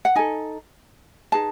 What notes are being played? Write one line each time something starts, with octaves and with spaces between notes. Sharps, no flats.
F#5
D#4 A4 G#5
D#4 G#4 B4 A5